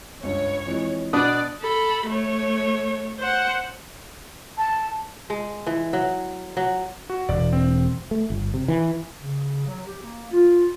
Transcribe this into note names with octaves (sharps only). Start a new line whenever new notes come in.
C#2 G2 C#5
F2 E3 G#3
B2 B3 D4 B4 D5 D#6 F#6
A4 B5
A3 C#5
C5 F#5
A5
G#3
E3
F#3
F#3
F#4
E1 D5
C4
A3
G1
C3
E3
C#3
F#3
G4
A#3
F4